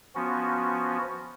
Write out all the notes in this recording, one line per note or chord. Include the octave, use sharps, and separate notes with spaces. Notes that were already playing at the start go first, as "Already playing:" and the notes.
F3 B3 C#4 F#4